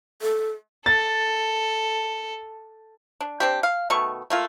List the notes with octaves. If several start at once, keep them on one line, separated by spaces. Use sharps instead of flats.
A4
A4 A6
D4
C4 D4 G4
F5
B2 D#3 A3 C#6
A3 A#3 F4